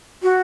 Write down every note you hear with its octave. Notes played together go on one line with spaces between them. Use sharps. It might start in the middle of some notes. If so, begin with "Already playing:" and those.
F#4